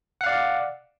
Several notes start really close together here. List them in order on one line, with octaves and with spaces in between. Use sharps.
F#5 F5 D5